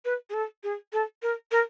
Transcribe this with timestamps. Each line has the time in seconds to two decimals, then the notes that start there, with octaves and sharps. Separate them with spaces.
0.05 B4
0.30 G#4
0.34 A4
0.64 G#4
0.93 A4
1.23 A#4
1.51 A#4